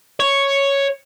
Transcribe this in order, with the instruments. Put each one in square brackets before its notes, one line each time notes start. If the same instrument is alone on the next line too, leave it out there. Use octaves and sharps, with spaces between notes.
[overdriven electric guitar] C#5